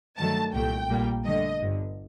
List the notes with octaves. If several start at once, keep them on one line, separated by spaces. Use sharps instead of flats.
G2 D#3 F#3 A3 A5
C2 A#2 A3 G5
A#1 A#2 G3 A#3
G2 D3 A3 D#5
G1 G2 D3